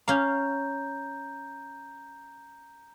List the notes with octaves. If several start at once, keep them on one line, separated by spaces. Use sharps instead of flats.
C#4 F5 A#5 G6